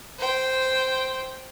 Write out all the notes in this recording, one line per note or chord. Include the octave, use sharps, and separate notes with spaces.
C5 G5